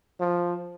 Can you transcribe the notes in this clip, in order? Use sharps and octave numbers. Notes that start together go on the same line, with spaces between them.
F3